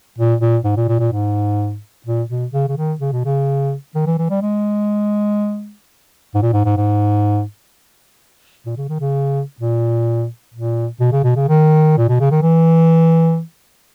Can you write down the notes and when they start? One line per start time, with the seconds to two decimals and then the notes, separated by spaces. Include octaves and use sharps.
0.18 A#2
0.41 A#2
0.64 G#2
0.77 A#2
0.89 A#2
1.00 A#2
1.12 G#2
2.06 A#2
2.29 B2
2.53 C#3
2.68 C#3
2.77 D#3
3.00 C#3
3.12 B2
3.25 C#3
3.95 D#3
4.06 E3
4.18 E3
4.30 G3
4.42 G#3
6.35 G#2
6.42 A#2
6.53 G#2
6.65 G#2
6.77 G#2
8.66 A#2
8.77 C#3
8.89 D#3
9.00 C#3
9.60 A#2
10.54 A#2
11.01 B2
11.12 C#3
11.24 B2
11.36 C#3
11.49 D#3
11.98 A#2
12.09 B2
12.20 C#3
12.31 D#3
12.42 E3